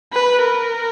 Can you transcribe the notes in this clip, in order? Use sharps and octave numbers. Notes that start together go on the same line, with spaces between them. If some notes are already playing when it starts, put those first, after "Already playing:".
B4
A#4